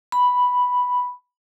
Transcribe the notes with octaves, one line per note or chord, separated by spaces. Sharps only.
B5